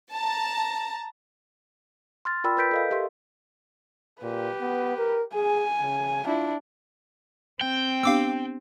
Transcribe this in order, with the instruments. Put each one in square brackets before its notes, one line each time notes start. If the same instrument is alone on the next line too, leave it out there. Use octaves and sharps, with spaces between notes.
[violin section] A5 A#5
[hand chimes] C6 F6 A6
F4 A#4 D5 G5 B5 E6
A#4 B4 G6 B6 D7
A4 D#5 F5
G4 A#4 E5 C6
[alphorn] A#2 [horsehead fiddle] G4 B4
[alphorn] B3
A#4
[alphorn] G#4 [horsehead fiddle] G#5
[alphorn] C#3
[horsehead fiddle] D4 E4 [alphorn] F4
[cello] C4 [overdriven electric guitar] G5
[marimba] B3 D4 G4 [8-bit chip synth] F5 D6 E6